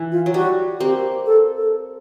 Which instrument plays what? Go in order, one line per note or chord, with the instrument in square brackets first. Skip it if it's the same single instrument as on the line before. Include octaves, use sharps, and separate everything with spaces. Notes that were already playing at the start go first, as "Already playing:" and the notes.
Already playing: [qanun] E3
[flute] F4
[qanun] F#3
[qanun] G3 [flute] F#4
[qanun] A#3 C4 [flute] G4
[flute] A4
A4